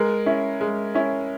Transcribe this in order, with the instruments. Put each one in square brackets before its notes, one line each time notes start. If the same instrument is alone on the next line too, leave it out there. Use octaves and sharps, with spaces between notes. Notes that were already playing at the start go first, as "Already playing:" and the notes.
Already playing: [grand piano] G#3 [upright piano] A#4
[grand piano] C#4 E4
G#3
C#4 E4